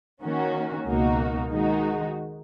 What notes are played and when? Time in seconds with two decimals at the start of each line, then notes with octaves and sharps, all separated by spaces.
0.23 D#3 A#3 C#4 F#4
0.87 C#2 B2 A#3 D#4 F#4
1.52 D#3 G#3 D#4 F#4